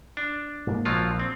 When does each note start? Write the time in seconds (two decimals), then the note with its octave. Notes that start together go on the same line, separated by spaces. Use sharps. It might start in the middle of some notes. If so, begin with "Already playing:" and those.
0.17 D4
0.67 G#2 A#3
0.85 A#1 F3 F#3 F4
1.20 C4